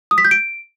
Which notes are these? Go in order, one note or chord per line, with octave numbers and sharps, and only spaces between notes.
D#6
B6
G6
D7